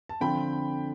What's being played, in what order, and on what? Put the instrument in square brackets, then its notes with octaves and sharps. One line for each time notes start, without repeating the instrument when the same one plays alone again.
[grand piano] A5
D3 F3 C4 G5 B5